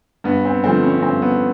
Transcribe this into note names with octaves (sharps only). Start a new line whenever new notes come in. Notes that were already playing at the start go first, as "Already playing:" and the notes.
G2 B3
C4
D3 F3 A3 C4
C#4
C#4
G2 C4
B3